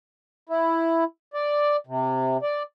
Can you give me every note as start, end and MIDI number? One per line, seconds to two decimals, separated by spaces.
0.49 1.04 64
1.34 1.76 74
1.87 2.37 48
2.42 2.63 74